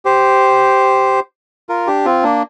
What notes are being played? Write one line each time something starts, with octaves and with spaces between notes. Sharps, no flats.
G4 C5
F4 A#4
D4 G4
C4 F4
A#3 D4